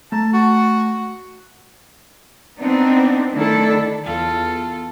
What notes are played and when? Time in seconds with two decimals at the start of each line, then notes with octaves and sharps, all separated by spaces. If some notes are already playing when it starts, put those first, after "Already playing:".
0.12 A3 A5 A#5
0.33 F#4
2.60 B3 C4 D4 D#4
3.33 D#3 A3 D4 E4 A4
4.04 E2 F4 A4